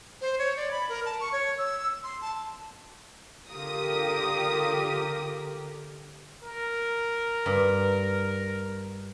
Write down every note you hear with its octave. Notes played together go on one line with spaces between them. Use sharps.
C5
C#5
D5
B5
A#4
A5
C#6
C#5
E6
C6
A5
D3 F4 G4 A#4 D#6
A#4
G2